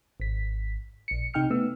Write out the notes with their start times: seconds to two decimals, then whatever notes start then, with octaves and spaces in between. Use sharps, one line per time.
0.20 G#1 B6
1.08 A#1 C#7
1.34 C3 D#4 G5 F6 C#7
1.50 A3 B3 E6